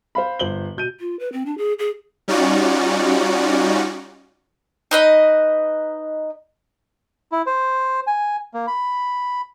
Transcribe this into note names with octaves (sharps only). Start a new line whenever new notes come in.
C5 F5 B5
G1 C5 F#7 G7
B2 G6 D#7
F4
B4
C4
D4
G#4
G#4
G3 C#4 D#4 F4 F#4 D5
D#4 B4 D#5
E4
C5
G#5
A#3
B5